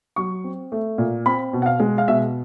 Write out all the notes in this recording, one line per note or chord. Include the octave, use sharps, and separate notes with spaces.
F#3 C#6
C4
A3
A#2
C4 B5
B2
F#5
F5
G#3
F5
B2 E5